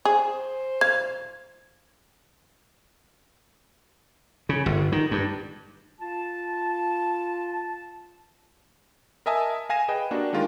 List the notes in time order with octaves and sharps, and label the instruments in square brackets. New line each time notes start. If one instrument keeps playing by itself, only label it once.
[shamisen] G#4 [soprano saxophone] C5
[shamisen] F5 [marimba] G#6
[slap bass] C#3
G1
D#3
G2
[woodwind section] F4 A5
[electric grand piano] A#4 D#5 E5 G#5 A5 D#6
F5 G#5 A#6 D#7 E7
G#4 B4 D#5 G5
A#3 D4 F#4 G4
D#3 G#3 D4 F4 G4 A#4